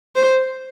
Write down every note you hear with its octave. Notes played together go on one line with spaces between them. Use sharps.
C5